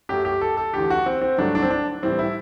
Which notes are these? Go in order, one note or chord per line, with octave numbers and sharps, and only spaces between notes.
F#2 F#3 A3 G4
G4
A4
A4
E2 D3 A3 G4
F#4
C4
C4
G2 D3 F#3 A3 D4
D4
C4
D4
A2 E3 G3 C4
E4